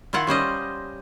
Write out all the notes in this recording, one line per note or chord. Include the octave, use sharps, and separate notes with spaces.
D#3 E4 F4 F#5
G3 C#4 C5 D#5